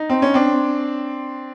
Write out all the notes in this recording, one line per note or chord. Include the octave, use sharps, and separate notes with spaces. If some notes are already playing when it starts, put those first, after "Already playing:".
Already playing: D#4
C4
C#4
C4 D4